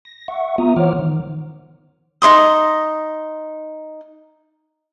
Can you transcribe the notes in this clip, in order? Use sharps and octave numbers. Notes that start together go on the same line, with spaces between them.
A#6
E5 F#5 C#6
B3 F4 E5 A#5 D#6
E3 C5 C#5 F#5 D6 F6
D#3
D#4 C5 C6 D#6